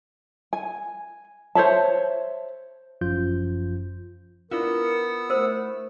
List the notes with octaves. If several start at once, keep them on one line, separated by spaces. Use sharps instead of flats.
G#5
C5 C#5 E5 A5
G1 F#2 F3 F4 G6
B3 D4 E4 F4 A#4 F#5 E6
A3 A#4 C5 B5